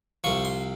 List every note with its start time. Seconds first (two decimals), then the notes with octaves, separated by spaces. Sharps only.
0.24 C2 C3 F3 C#6
0.45 C6